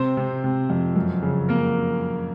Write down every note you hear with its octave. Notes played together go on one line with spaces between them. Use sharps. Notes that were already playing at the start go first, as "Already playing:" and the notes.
Already playing: C3 C4 C5
C3
C3
F2
F#2
C#3
A#3 A#4